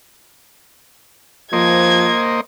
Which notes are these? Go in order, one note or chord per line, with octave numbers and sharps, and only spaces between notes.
F3 A#3 C5 D#5 G#6